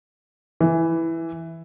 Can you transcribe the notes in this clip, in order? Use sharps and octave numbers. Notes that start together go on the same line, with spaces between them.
E3